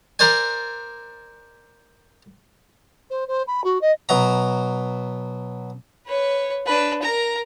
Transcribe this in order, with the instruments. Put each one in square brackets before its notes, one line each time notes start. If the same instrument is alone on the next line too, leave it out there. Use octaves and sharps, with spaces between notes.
[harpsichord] A#4 C5 D5 G#5
[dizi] C5
C5
B5
F#4
D#5
[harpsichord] B2 F#3 A#5
[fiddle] B4 C#5
D4 B4
A#4 A#5